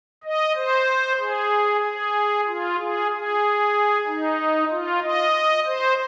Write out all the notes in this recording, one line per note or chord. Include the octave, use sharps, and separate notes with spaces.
D#5
C5
G#4
G#4
F4
G#4
G#4
D#4
F4
D#5
C5